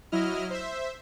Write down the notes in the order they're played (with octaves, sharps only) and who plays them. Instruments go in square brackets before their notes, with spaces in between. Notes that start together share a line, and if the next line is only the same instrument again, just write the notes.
[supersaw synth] F#3 E4 D#5 F6
C5 E5